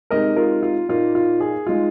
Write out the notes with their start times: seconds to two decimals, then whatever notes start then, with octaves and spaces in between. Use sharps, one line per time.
0.10 C3 G#3 D#4 A#4 D#5
0.36 F4 A#4
0.63 F4
0.89 A#2 A#3 D#4 F4
1.15 F4
1.40 G#4
1.67 G#3 D#4 F4